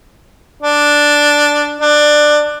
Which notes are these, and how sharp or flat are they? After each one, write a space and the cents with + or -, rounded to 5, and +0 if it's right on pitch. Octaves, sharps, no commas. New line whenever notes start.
D4 +0
D4 +15